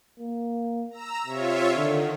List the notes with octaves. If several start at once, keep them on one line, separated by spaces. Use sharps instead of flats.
A#3
A#5 E6
C3 F4 C#5 E5
D3 D#3